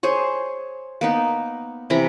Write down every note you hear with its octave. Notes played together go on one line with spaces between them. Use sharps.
G#4 C5 C#5
A#3 B3 D#4
C3 E3 A#5 B5